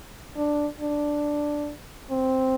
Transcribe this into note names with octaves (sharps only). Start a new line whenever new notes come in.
D4
D4
C4